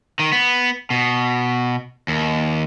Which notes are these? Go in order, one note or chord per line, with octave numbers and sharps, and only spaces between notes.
D#3
B3
B2
D#2